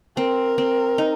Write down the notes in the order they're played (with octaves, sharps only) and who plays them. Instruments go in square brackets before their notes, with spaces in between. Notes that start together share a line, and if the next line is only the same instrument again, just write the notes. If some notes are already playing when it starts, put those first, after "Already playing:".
[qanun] C4 [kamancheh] A#4
[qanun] C4
D#4